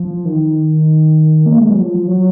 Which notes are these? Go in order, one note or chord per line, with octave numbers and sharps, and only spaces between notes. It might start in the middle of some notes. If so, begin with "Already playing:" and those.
Already playing: F3
D#3
A#3
G#3
F#3
F3
F3
F#3